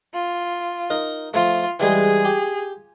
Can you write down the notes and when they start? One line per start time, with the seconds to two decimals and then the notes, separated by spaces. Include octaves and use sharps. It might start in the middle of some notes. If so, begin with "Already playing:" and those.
0.14 F4
0.90 D#4 A#4
1.34 F3 A3 F4
1.80 E3 G3 G#3 G#4
2.25 G4